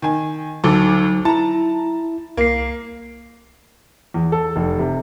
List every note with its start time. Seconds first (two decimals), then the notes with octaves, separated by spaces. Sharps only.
0.02 D#3 G#5
0.64 D2 F#3 D#4 A4 D6
1.25 E4 A5 A#5
2.37 C2 A#3 C7
4.14 E2
4.32 A4
4.56 F1
4.79 C3